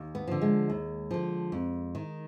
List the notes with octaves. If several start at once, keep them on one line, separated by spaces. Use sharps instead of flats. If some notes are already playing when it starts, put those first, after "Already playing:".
Already playing: D#2
B3
D3 F3
G#3
D#2
D3 F3
F2
D#3